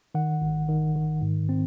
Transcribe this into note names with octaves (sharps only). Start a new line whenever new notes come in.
D#3 F#5
G#1
D#3
D#3
G#2
C4